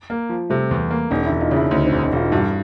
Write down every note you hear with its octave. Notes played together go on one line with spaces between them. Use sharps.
A#3
F3
C3 G3 A3
E2
A#3
E1 C#4 D#4
D4 E4
E1
D#4 F4
C#3
D4 E4
D2 C#4 D#4
C4 D4
E1
C#4 D#4
E1 D#4 F4
G2 E4 F#4